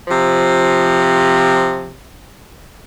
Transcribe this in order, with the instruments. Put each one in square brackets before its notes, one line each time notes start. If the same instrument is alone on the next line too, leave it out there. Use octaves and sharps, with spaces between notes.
[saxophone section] C3 F3